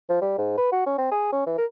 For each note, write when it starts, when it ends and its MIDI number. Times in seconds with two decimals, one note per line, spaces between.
0.09 0.21 53
0.21 0.35 55
0.38 0.57 44
0.57 0.69 71
0.72 0.81 66
0.86 0.98 61
0.98 1.11 60
1.11 1.28 68
1.32 1.43 61
1.47 1.57 52
1.58 1.65 70